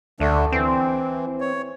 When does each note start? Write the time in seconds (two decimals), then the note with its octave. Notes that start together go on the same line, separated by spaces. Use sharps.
0.20 D2 D3 A3 D4
0.52 E3 C4
1.40 C#5